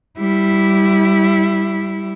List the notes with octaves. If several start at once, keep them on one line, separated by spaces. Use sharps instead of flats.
G3 E4